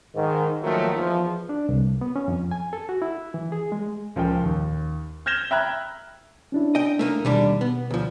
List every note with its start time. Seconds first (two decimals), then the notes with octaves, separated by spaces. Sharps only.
0.14 G#2 D#3
0.62 D#2 D#3 F3 F#3 A3 A#3
0.96 E2 F3
1.49 D4
1.69 C2
2.01 B3
2.16 C#4
2.28 F2
2.51 G#5
2.73 A4
2.89 F#4
3.02 E4
3.34 E3
3.52 G#4
3.72 G#3
4.16 C#2 F3 A#4 G5
4.44 D#2
5.26 F6 G6 G#6 A#6 E7 G7
5.51 E5 G5 A#5 B5 F#6 G#6
6.52 C#4 D4 E4
6.75 D#5 G5
6.99 A3 A#3 D#4
7.25 D#2 B2 G3 D4
7.61 B3
7.91 D2 F3